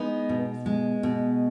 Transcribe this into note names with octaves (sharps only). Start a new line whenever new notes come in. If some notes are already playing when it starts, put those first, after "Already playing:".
Already playing: G#3 B3 D#4
B2
G#3
B2